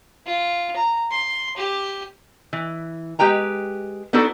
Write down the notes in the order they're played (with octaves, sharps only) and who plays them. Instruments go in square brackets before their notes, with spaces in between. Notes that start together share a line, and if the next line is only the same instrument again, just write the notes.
[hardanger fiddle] F4
A#5
C6
G4
[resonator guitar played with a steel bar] E3
G#3 G4 B4 G5 A#5
B3 D4 D#4 F#4 A4